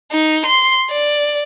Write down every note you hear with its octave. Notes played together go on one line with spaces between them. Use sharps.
D#4
C6
D5